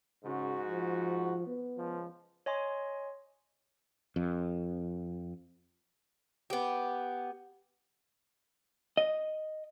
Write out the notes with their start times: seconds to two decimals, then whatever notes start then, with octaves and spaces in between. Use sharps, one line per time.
0.25 G#2 C#3 F#4
0.65 F3
1.47 B3
1.77 C#2 F3
2.46 C#5 D#5 G#5 C6
4.16 F2
6.50 B3 G4
8.97 D#5